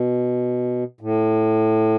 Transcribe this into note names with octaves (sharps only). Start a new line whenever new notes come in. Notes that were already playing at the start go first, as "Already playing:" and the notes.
Already playing: B2
A2